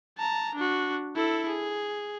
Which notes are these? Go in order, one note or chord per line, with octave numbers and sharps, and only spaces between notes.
A5 A#5
D4 F#4
E4 A4
G#4